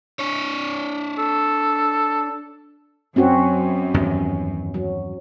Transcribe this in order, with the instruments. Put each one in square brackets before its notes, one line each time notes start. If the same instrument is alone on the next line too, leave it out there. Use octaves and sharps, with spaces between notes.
[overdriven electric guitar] D4 C#5
[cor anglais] A4
[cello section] F#2 [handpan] C4 C#4 F#4
[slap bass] E2 G2 D#3 [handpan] C#4
[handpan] F#3